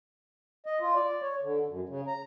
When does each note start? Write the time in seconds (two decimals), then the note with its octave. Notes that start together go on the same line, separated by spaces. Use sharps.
0.66 D#5
0.80 F4
0.95 D5
1.22 C#5
1.42 D3
1.67 F#2
1.89 C#3
2.07 A#5